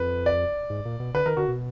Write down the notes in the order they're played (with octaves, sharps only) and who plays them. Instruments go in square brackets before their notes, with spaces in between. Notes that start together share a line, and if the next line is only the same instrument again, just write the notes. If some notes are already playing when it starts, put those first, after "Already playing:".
Already playing: [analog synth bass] F2 [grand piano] B4
[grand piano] D5
[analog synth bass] G#2
A#2
B2
[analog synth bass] D3 [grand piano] B4
[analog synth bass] D#3 [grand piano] A#4
[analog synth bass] D3 [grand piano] F#4
[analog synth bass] B2